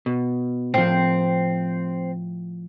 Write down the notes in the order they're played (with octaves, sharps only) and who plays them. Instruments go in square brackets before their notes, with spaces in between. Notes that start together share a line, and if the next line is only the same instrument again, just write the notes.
[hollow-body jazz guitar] B2
[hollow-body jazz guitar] A2 F3 [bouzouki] C4